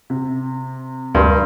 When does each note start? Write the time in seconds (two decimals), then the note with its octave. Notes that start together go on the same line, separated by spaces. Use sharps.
0.10 C3
1.15 D2 G2 A#4 D5 C6